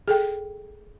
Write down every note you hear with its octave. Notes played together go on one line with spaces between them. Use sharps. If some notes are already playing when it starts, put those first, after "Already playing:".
G#4 A4 G5